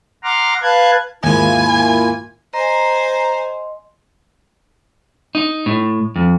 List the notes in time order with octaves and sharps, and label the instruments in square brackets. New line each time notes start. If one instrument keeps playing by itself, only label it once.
[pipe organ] F#5 A#5 C6 D6 F6
B4 F5 A5 F#6 G#6
[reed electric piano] D#2 G#2 [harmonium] A#3 E4 F4 [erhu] G#5
[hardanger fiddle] C5 G#5 [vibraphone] D#5 C6 [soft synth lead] A#5
[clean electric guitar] D#4
A2
F2